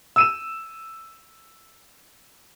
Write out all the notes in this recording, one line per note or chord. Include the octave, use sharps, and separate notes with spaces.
E6 D#7 E7